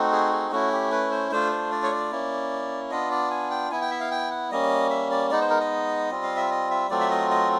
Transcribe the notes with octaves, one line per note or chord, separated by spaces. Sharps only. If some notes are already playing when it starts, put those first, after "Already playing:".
Already playing: A3 C4 D#4 F#4
G#4
G#4
A3 C#4 E4 F#4
G4
B4
C5
A3 D4 F4 C5
C5
D5
C#5
D5
A#3 C#4 E4
B3 D4 F4 D#5
D5
G#5
G5
B3 E4 G#5
G5
E5
F5
G5
F#5
G3 A#3 C#4 D#5
E5
D5
G#3 B3 D#4 D5
C5
A#4
D#5
G3 C4 F4
F5
E5
D#5
E5
F#3 A3 C4 F4 D5
E5
D#5
D#5